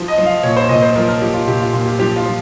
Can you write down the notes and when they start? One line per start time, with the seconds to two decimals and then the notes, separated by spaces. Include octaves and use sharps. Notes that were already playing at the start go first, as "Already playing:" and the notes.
Already playing: F3
0.08 D#5
0.18 F3
0.26 F5
0.43 A#2 C#5
0.57 C5
0.69 A#2 D#5
0.83 C5
0.96 F3 A#4
1.08 A#4
1.22 F3 G4
1.34 F4
1.47 A#2 G4
1.60 F4
1.73 A#2 F4
1.86 G4
1.99 F3 G4
2.16 F4
2.25 F3